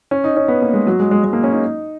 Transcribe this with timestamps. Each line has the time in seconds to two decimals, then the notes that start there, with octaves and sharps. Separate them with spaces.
0.11 C#4
0.24 D#4
0.36 C#4
0.48 B3
0.62 A#3
0.74 G#3
0.87 F#3
1.00 G#3
1.11 G#3
1.24 G#3
1.33 A#3
1.43 C#4
1.52 D#4